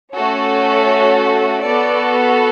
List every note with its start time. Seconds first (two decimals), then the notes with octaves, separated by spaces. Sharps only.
0.14 A3 C#4 F#4 A4 C#5
1.64 B3 F#4 A4 D5